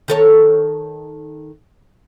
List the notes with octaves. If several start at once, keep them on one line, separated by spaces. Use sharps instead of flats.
D#3 A4 C#5